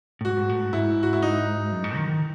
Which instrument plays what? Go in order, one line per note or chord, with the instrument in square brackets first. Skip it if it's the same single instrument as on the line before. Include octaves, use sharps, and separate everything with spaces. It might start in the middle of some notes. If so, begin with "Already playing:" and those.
[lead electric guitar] A2
[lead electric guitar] G#2 [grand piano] F#4
[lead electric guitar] G#2
A2
G#2
[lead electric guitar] G#2 [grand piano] E4
[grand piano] F#4
E4
D#4
[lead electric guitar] F#2
G#2
D#3
D#3